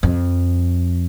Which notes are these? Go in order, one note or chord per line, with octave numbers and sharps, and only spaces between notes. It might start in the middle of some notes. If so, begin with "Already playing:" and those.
F2